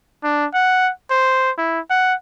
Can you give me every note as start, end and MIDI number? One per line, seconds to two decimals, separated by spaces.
0.24 0.46 62
0.54 0.91 78
1.11 1.51 72
1.58 1.80 64
1.90 2.14 78